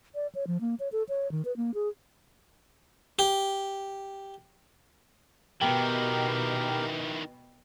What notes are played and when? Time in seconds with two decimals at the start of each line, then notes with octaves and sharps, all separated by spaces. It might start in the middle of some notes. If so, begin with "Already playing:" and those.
0.15 D5
0.35 C#5
0.47 F3
0.61 A#3
0.80 C#5
0.92 A4
1.09 C#5
1.31 D#3
1.45 B4
1.57 A#3
1.74 G#4
3.19 G4
5.62 B2 D#3 E3 G4 A#4 G5